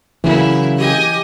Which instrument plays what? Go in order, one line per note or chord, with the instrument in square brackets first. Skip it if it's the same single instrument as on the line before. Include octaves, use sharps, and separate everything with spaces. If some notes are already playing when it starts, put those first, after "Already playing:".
[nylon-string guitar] C#3 F#3 A#3 [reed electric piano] E3 [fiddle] E4
[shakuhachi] G4 [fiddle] D#5 G#5